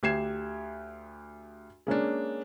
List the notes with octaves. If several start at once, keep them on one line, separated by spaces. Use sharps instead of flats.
D2 G4 G#6 C7 E7
G#3 A#3 C#4 D4